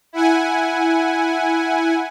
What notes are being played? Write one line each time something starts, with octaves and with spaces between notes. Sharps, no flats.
E4 F#5 G#5